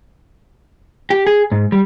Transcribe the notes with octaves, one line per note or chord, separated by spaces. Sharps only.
G4
G#4
G#2
G3